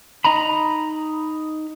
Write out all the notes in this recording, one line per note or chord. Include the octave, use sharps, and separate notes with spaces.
D#4 D#5 A#5 B5